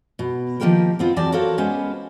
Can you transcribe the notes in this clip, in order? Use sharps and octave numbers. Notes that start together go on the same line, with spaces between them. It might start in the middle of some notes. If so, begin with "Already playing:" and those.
B2
D#3 F3 G#3 A#3 G4 A#4
B3 C4 F4
E2 F#3 C4 D5 A5
F#4 A4 A#4 C5 C#5 F5
G#3 B3 C#4 C5